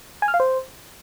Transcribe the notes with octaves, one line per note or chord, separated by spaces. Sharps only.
G#5
F6
F5
C5